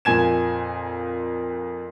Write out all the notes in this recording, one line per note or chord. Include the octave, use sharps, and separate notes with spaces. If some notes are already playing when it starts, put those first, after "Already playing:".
F2 A#2 G#5 G#6 E7